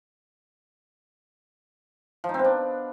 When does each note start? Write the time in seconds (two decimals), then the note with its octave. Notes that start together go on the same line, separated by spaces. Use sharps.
2.24 F3
2.29 D#4
2.34 C4
2.39 B3
2.44 D4